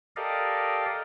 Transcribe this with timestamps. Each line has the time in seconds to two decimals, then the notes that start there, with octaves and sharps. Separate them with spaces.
0.16 G4 A4 A#4 D5 D#5 F5